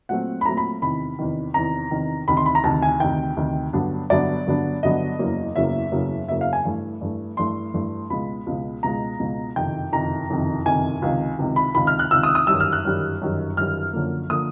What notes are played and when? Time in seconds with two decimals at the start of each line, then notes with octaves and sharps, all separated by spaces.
0.09 A#2 F#3 A3 C4 F#5
0.41 B5
0.45 A#2 F#3 A3 C4 A#5
0.57 B5
0.82 E2 C3 D#3 B5
1.19 E2 C3 D#3
1.54 E2 C3 D#3 A#5
1.91 E2 C3 D#3
2.28 D2 C3 D#3 B5
2.37 C6
2.46 B5
2.55 A#5
2.64 D2 C3 D#3 A5
2.82 G#5
3.00 D2 C3 D#3 G5
3.37 D2 C3 D#3
3.73 G2 D3 F#3 B3 D4
4.10 G2 D3 F#3 B3 D4 D5
4.46 G2 D3 F#3 B3 D4
4.83 G2 D3 F#3 B3 D4 D#5
5.19 F#1 E2 C#3 F#3 A#3
5.56 F#1 E2 C#3 F#3 A#3 E5
5.92 F#1 E2 C#3 F#3 A#3
6.28 F#1 E2 C#3 F#3 A#3 E5
6.41 F5
6.53 G#5
6.65 G2 E3 A3
7.01 G2 E3 A3
7.37 G2 E3 A3 C6
7.74 G2 E3 A3
8.10 C#2 B2 G#3 B5
8.46 C#2 B2 G#3
8.83 C#2 B2 G#3 A#5
9.19 C#2 B2 G#3
9.56 F#1 F2 C3 D#3 G5
9.92 F#1 F2 C3 D#3 A#5
10.29 F#1 F2 C3 D#3
10.66 F#1 F2 C3 D#3 G#5
11.02 C#2 C3 D#3
11.39 C#2 C3 D#3
11.56 B5
11.75 C#2 C3 D#3 B5
11.87 F6
11.99 F#6
12.11 C#2 C3 D#3 E6
12.23 D#6
12.35 D#6
12.47 G1 F#2 D#3 G3 E6
12.60 F6
12.72 F#6
12.84 G1 F#2 D#3 G3
13.21 G1 F#2 D#3 G3
13.57 G1 F#2 D#3 G3 F6
13.93 F#2 D3 F3 A#3
14.30 D3 F3 A#3 D#6